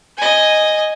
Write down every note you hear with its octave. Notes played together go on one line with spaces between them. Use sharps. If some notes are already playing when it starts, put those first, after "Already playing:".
D#5 G#5